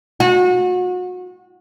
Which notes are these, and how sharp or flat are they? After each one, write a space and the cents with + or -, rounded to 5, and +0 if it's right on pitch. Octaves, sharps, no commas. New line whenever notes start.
F#4 -30